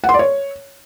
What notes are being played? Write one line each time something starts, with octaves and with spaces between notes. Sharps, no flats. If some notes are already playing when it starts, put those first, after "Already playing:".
F#5
C6
D5
C#5